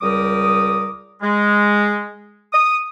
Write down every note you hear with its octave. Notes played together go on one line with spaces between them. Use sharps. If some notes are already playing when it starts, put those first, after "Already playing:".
C#2 G3 A#4 D6 D#6
G#3
D#6